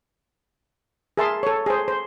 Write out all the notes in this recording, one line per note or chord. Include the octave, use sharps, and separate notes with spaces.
G#4 A#4 E5 A5 C6
A4 C#5
G#4 C5
C5